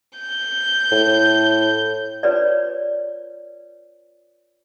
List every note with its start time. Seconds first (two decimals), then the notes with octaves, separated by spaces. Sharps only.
0.19 G6
0.91 A2
2.23 F4 B4 C#5 D5